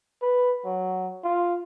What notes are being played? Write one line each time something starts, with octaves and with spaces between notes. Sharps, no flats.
B4
F#3
F4